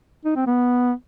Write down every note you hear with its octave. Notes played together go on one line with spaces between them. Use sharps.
D#4
C4
B3